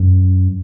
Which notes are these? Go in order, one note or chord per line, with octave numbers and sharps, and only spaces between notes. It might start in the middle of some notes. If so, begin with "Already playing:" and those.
Already playing: F#2